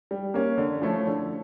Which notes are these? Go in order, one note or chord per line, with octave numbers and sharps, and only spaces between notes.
G3
A#3 C#4
D3
F3 A3 C#4 E4
D3